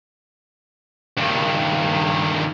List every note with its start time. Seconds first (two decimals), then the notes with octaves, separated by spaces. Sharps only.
1.17 G2 D#3